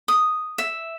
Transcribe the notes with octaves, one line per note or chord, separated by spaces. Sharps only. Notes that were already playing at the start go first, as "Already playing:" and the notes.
D#6
E5